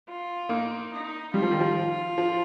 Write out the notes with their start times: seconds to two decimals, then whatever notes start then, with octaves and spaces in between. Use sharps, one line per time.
0.08 F4
0.49 A#3 D#4
0.92 D#4
1.34 G3 F4
1.42 F3
1.51 D#3
1.60 F3
2.18 F3